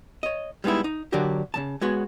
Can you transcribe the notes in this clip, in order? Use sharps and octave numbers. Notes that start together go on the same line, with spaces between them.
C#5 D#5
G3 G#3 B3 D#4 E4
D#4
D3 F#3 D4 F#4 G4 A#4
C#3 F3 A5
G#3 B3 F#4 C#5